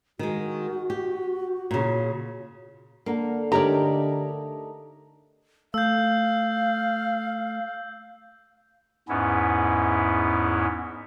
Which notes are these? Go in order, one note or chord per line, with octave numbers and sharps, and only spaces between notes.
D#3 G#3 F#4
G4
A#2 C#3
D3 A#3 A#4 F#5
D3 A3 D#4 G4 A#4 C#5 D5 A#5
A3 F5 E6 G6
E2 G#2 B3 C#4 E4